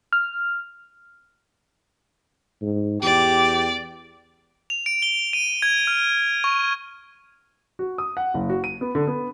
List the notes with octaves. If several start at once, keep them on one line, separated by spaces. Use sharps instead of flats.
F6
G#2
E2 G4 D5
F7
D7
G7
D#7
G#6
F6
C#6
F#4
D#6
F#5
F#1
F#4
D#7
B3
D3
B3